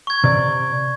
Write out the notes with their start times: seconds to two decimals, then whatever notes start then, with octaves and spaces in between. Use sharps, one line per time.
0.07 C#6 G#6
0.24 C3 D5